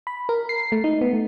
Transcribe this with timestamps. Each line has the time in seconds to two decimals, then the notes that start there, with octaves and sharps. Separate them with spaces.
0.07 B5
0.29 A#4
0.49 C7
0.72 A3
0.84 D#4
1.01 B3
1.13 A3